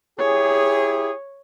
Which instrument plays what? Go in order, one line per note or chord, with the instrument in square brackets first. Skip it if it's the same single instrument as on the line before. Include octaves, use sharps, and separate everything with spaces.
[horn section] E4 G4 G#4 [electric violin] C#5